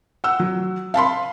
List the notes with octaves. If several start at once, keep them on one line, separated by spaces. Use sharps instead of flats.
F#5 E6
F#3
F5 A5 B5 C6